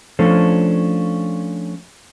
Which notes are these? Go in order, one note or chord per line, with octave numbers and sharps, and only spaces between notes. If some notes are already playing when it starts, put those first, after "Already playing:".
F3 A3 C#4 D4 A4 C5